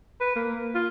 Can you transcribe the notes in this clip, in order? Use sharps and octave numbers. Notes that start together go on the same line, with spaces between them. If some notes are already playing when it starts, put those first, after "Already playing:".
B4
A#3
F4